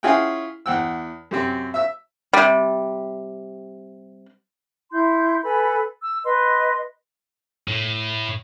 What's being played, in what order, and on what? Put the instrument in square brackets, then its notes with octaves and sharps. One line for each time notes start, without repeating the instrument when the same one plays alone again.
[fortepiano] C#4 E4 F4 G#4 F#5 G5
E2 F#5 G5 E6
F#2 C3 C4
E5 E6
[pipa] C3 G3
[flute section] E4 C6 G6
A4 B4 G#5 B5
E6
B4 D#5 C6
[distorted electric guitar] A2